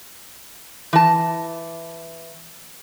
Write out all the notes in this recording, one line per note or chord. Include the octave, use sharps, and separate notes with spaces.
E3 A5